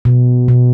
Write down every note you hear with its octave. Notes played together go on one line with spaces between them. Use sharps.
B2
B2